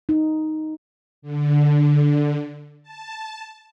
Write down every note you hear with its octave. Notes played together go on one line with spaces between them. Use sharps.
D#4
D3
A5